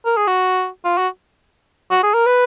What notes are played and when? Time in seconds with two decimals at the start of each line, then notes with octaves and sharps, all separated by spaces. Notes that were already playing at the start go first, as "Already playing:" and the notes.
0.05 A#4
0.17 G#4
0.27 F#4
0.85 F4
0.98 F#4
1.91 F#4
2.03 G#4
2.14 A#4
2.26 B4